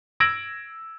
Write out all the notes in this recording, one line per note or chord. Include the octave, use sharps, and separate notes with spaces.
E6 G#6 A#6 D7 F#7